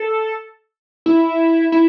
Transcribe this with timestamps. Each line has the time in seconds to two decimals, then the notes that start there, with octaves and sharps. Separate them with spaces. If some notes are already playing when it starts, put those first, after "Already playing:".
Already playing: A4
1.06 E4
1.72 E4